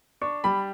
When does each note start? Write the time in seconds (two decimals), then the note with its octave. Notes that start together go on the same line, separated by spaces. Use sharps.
0.21 D4 C#6
0.44 G3 B5